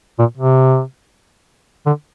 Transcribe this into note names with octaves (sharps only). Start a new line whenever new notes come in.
A#2
C3
D3